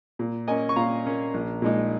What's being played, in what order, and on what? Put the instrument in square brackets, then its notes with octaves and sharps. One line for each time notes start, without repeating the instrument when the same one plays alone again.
[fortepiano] A#2
A#3 C#4 D#5 G#5
C#6
A#2 F5 A#5
A#3 C#4
A#1
A#2 G#3 D#4